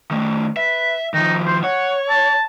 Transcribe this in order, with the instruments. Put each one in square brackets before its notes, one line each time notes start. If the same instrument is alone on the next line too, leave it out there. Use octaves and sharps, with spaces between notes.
[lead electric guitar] D#3 A3
[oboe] B4 [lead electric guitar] E5
[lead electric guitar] D#3 F3 [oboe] D#4
[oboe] C5
[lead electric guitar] C#5 [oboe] F#5
[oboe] A5